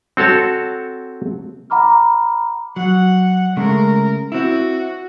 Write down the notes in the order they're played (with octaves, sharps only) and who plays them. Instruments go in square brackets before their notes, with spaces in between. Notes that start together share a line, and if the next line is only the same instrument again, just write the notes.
[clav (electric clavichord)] C4 F#4 A4 C#5 A5
[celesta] F#5 A#5 B5 D6 F6
[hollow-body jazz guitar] F#3 [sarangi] F#5
[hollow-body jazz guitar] C#3 G#3 A3 [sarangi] A#4
[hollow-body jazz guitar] C4 E4 [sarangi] F#4